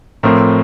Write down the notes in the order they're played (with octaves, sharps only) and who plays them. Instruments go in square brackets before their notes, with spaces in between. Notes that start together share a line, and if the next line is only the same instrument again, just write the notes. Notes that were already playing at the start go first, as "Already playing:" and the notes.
[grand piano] A2 F3 A3 C4 A#4